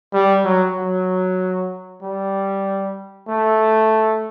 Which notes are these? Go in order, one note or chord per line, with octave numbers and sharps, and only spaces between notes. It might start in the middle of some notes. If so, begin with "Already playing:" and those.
G3
F#3
F#3
G3
A3